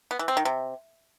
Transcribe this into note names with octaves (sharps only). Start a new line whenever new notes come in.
B3
E3
C4
D#3
C3